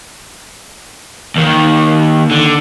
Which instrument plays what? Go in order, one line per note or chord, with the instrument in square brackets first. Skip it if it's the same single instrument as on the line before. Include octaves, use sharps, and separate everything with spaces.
[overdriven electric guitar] D#2 D#3
D3